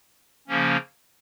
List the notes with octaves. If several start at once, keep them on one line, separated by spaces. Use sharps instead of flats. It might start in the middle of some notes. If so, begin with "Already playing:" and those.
C#3 F3 A#3 C#4